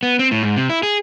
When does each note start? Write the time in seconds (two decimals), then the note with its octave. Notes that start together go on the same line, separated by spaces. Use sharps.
0.03 B3
0.19 C4
0.31 A2
0.43 G#2
0.56 C3
0.69 E4
0.83 G#4